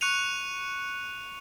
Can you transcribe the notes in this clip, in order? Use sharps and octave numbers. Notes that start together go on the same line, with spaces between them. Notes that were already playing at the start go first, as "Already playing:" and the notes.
C#6 F#6 C#7 D#7 F7